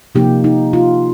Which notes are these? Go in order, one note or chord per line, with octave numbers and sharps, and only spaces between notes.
C3 F3 A#3 D#4 G4
D#4
F4